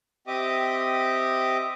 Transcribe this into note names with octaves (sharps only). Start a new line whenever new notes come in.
C4 G4 D#5 E5 D6 D#6